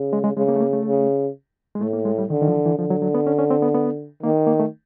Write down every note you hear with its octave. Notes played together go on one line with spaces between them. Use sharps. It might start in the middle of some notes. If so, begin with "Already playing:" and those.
Already playing: C#3
G#3
G#3
C#3 G#3
A#3
A3
A#3
A3
C#3
G#3
A2 A3
A#3
G#3
G3
D3 D#3
D#3
F3
E3
E3
D3 F3
F#3
F#3
B3
C#4
C#4
C4
B3
B3
D#3 A#3
A#3
A3